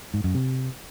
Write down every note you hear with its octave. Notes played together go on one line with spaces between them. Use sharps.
G#2
F#2
C3